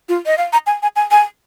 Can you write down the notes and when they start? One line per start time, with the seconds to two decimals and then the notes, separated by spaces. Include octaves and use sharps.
0.09 F4
0.26 D#5
0.38 F5
0.53 A#5
0.67 G#5
0.82 G#5
0.96 G#5
1.11 G#5